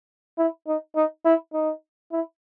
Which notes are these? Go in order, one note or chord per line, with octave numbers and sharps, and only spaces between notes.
E4
D#4
D#4
E4
D#4
E4